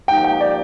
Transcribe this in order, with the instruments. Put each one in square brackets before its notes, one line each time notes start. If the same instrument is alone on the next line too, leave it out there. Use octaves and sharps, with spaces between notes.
[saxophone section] F3 A#3 D#4 G4 [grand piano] G5
[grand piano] G5
D5